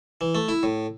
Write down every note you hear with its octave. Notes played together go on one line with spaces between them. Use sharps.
E3
A3
E4
A2